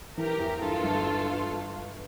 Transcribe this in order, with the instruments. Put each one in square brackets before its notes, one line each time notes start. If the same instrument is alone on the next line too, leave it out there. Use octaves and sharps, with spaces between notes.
[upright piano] E3 [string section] G4 A#4
[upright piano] E2
[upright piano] G2 [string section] F4 A4
[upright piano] G1
G2